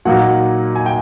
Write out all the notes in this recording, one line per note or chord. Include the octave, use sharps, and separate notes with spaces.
A#2 F#3 A#3 D#4 F#5
G#5
G5